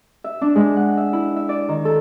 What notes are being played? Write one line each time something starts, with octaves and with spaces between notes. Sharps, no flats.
E5
D4
G#3
F#5
E5
E4
E5
D5
D#3
A4